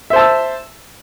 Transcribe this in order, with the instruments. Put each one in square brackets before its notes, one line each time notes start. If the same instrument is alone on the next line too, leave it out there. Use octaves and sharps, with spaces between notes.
[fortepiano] E5
C5
A5
E6